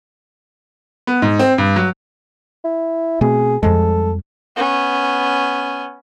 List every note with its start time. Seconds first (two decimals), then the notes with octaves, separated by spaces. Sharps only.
1.07 B3
1.22 G#2
1.39 C4
1.58 G2
1.76 F#3
2.64 E4
3.21 B2 A3 C4 G#4
3.63 F2 F3 G3 G#3 A4
4.56 B3 C#4